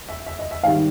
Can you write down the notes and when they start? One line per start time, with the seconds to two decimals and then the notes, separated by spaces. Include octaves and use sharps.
0.09 E5
0.26 E5
0.39 D#5
0.51 E5
0.63 G#2 D#3 G3 F5